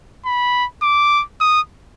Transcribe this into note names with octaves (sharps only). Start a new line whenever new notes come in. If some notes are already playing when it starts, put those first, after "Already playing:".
B5
D6
D#6